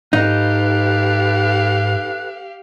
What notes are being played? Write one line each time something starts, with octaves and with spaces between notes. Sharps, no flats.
G#2 D#4 G4 A4 B4 F5 F#6